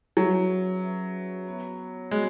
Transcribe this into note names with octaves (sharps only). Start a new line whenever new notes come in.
F#3 C#4 G#4 B4 E5
C#4 G#4 B4 E5
B3 F#4 C#5
G#3 B3 F#4 C#5